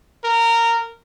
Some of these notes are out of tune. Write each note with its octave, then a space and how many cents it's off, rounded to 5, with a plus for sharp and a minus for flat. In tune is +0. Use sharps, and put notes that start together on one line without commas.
A#4 -15